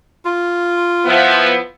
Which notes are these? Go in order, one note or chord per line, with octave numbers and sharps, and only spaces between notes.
F4
F3 B3 E4